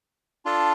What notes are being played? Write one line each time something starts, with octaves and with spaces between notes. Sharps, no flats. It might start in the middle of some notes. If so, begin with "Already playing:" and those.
D4 F4 A4